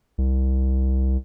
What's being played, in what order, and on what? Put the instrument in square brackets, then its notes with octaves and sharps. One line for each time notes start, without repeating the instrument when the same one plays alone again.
[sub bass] C2